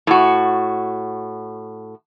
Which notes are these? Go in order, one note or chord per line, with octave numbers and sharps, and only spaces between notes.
A2 F#4